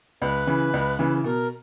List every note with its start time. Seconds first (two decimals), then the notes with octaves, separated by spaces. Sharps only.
0.22 C#2 B4
0.47 C#3 E3
0.74 C#2
0.99 C#3 E3
1.24 B2 A#4